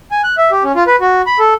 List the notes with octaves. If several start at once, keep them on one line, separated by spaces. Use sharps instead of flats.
G#5
F#6
E5
G4
C#4
F4
B4
F#4
B5
A4